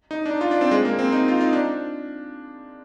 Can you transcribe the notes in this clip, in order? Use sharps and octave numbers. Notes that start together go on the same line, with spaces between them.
D#4
D4
D#4
F4
D4
C4
G#3
A#3
C4
D#4
F4
D#4
D4